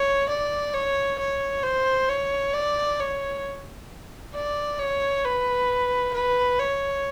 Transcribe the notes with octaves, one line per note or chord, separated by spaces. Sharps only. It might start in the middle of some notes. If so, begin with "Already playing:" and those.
Already playing: C#5
D5
C#5
C#5
C5
C#5
D5
C#5
D5
C#5
B4
B4
C#5